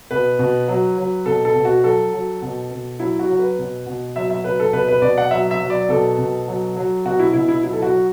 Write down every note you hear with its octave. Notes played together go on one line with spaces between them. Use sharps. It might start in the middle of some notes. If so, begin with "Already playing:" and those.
B2 B4
B2
F#3
F#3
B2 A4
A4
B2
F#4
F#3 A4
F#3
B2
B2
F#3 E4
F#4
F#3
B4
B2
B2
F#3 E5
E5
F#3 B4
A4
B2 B4
B4
B2 D5
F#5
F#3 E5
E5
F#3
D5
B2 A4
B2
F#3
F#3
B2 F#4
E4
B2 E4
E4
F#3 E4
A4
F#4
F#3